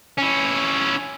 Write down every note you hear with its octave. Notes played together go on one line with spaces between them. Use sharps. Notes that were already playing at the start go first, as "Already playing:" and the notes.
C#4 E4